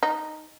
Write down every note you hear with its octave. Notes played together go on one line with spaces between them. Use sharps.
D#4